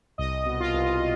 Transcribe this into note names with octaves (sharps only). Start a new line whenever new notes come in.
C2 D#5
B2
F4
C2